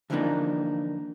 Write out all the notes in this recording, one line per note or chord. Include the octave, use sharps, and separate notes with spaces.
D3 E3 F3 A#3 D4 D#4